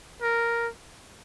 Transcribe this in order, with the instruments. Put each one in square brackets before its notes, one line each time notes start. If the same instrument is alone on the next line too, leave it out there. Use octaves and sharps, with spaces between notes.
[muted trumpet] A#4